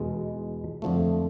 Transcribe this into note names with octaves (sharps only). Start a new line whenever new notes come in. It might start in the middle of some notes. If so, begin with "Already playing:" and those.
Already playing: E2 B2 G#3
F2 D3 F3 A3